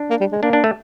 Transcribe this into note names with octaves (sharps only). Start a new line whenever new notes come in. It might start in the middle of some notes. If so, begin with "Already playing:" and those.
Already playing: D4
A#3
G3
G#3
A#3 D4
D4
A3